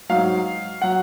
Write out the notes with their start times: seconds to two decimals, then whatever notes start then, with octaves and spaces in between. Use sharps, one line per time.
0.09 G#2 F#3 F5
0.82 F#3 F#5